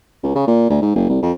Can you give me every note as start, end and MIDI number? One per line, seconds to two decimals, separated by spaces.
0.23 0.34 37
0.35 0.47 49
0.47 0.68 46
0.70 0.78 38
0.82 0.92 44
0.95 1.08 30
1.09 1.18 36
1.23 1.32 41